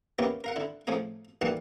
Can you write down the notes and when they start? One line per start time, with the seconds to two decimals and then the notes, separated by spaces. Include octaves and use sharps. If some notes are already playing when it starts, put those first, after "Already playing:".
0.19 A#3 B3 C#4 E4 G4
0.44 A#4 F5 F#5
0.56 D3 E4
0.87 A2 F3 A3 G#4 G#5
1.41 B1 A#2 E3 G3 F#5 A5